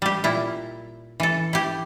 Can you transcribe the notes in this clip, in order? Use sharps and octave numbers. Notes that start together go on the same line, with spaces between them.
G3 G4
A#2 E4
E3 A4
E4 G4